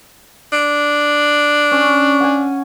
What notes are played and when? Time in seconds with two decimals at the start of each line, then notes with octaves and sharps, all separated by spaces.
0.52 D4
1.71 C#4
2.20 F#5 G#5